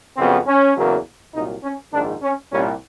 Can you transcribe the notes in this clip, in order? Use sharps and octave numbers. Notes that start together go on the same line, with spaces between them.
F2 C#3 F#3 B3 C4
C#4
E2 C#3 F#3 A#3
C2 A#2 F#3 D#4
C#4
A#1 G#2 D#3 D4
C#4
C2 A#2 G3 C#4